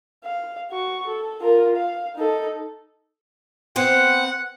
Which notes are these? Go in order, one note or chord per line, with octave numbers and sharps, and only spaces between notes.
F5
F#4 C#6
A4
F4 A#4
F5
D#4 A4
B3 C4 C5 F#5